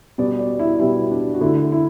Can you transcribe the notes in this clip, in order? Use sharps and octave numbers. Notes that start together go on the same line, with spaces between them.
B2 G3 B3 D5
D5
E4
B2 G3 B3 E4
D4
F#4
D3 A3 E4
E4